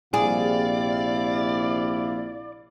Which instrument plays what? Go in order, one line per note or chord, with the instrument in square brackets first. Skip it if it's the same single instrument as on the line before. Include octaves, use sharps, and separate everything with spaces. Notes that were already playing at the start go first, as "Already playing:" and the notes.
[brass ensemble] A#1 C3 F5 [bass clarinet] E4 [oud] G#4 [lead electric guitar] D5